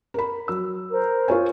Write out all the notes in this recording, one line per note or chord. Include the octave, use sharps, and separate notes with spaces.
A#4 B5
F#3 E6
A#4 C5
F4 C#5 G#5